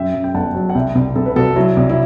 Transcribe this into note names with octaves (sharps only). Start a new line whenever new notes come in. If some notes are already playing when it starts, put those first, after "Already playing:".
Already playing: F#2 E5 G5
F#2
G5
G1 F#5 A5
F#3
F#5
C2 E5 G5
C2
C2 A4
B4
C2 F#4 A4
F#3 E4
C2
E4